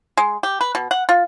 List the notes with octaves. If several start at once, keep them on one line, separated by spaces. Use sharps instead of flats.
G#3
G4
B4
B2
F#5
F4